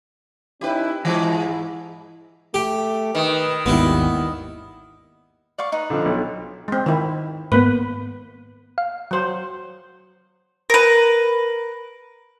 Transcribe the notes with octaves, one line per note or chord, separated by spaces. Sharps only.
C#4 D#4 E4 G4 B4
G#2 E3 G#3 E4 G#4
A3 G4
D#3 B4
G#1 D#2 G3 B3 E4
D5 F5 C#6
D#4 B4
D3 F3
B1
G#3 C4
D#3 E4
G#2 A#3 B3 B4
F5
F#3 C5
A#4 B4